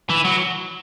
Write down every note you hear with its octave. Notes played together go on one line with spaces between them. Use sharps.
E3
F#3